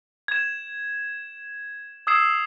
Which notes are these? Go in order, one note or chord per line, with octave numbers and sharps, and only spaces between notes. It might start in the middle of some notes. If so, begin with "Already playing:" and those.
G#6 E7
D#6 E6 G#6 C7 E7